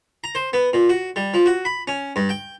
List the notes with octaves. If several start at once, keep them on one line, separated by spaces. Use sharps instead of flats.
A#5
C5
B3
A#2
F#4
G3
F3
F#4
B5
C#4
G2
G5